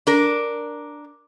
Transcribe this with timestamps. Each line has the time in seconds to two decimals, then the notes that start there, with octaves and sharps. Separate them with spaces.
0.07 D4 A#4